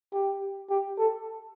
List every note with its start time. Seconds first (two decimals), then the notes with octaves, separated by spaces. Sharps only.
0.13 G4
0.70 G4
0.98 A4